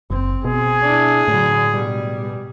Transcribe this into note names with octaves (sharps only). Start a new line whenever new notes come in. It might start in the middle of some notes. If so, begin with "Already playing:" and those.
F#1 C4
B2 G#4
D4 E4
A2 D3 F#3
B2 G3